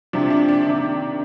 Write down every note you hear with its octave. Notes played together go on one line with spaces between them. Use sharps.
C3 F3 D4
D4
D4
C3 D#3